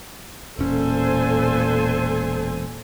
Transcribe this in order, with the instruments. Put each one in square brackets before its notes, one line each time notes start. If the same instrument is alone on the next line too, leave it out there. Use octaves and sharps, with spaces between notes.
[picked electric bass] E1 C#4 [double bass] A#2 [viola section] A4 C5 G#5